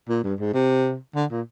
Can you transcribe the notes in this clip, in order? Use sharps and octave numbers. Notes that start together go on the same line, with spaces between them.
A#2
G2
G#2
C3
D3
A#2